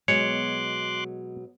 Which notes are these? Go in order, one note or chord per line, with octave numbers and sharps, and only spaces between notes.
B2 F#3 G#3 C#5 C6 D6 F#6